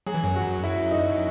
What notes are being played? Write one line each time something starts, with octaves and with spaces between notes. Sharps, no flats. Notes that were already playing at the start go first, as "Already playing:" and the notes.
F#3 G#4
E3
F#2 F#3
F#4
E4
D#4